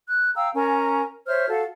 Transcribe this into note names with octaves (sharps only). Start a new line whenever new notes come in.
F#6
F5 G5 A#5 E6
C#4 A#4 G#5 A#5
C5 C#5 E5 F6
F#4 A4 F5